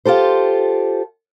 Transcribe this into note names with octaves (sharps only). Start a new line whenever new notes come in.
F4 G4 A4 C5